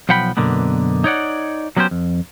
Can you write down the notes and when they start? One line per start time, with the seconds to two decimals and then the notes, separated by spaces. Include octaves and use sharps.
0.09 B1 F3 F#5 G5 B5
0.37 F#2 B2 D3 A#3 B3
1.04 D#4 C#5 D5 F#5
1.77 F#3 B3 C#4 G4 C5
1.91 F2